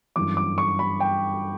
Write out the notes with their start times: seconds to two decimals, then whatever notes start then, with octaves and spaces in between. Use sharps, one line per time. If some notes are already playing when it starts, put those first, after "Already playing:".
0.16 G1 F#2 E3 D6
0.37 D6
0.58 C#6
0.79 B5
1.00 G5